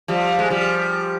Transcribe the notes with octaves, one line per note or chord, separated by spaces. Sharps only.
F3 G3
G#3
F3 G3